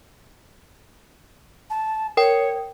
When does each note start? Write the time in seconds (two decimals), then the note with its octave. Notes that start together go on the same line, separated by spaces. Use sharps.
1.70 A5
2.17 A#4 C#5 G5